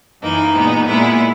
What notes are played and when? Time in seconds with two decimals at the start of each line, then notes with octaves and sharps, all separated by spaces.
0.22 F#2 E3 A#3 D#4
0.55 A#2 G#3 B3
0.86 A#2 G#3 B3 E4